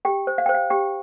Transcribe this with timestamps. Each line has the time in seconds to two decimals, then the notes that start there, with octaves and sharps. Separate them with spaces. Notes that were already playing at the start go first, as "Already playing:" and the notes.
0.05 G4 G5
0.27 C5
0.38 F5
0.46 G5
0.49 C5
0.54 F5
0.70 G4 G5